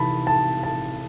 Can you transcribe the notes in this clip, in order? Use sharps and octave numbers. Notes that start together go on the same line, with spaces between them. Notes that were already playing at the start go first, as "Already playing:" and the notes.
Already playing: C3 E3 D#4 A5 B5
A5
A5